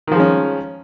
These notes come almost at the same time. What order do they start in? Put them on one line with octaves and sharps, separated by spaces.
D#3 F3 G#3 C#4